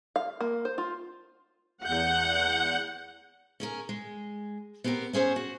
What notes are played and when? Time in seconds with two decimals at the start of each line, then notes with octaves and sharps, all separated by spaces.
0.16 F5
0.41 A#3
0.65 C5
0.78 F4
1.85 E2 F#5 G6
3.60 C#4 G#4 A#4
3.89 G#3
4.84 B3 C4 G4 A4 A#4
5.13 B3 C#4 G#4 C5 C#5
5.36 F#4